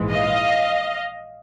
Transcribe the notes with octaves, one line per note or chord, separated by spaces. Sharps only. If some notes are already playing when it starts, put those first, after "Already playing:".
Already playing: A#1 G#2 E3 G#3
D#5 F5